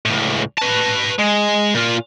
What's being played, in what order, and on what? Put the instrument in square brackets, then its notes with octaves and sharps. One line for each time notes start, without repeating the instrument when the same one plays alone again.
[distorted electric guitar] C#2 A2
B4 A5
G#3
A#2 F4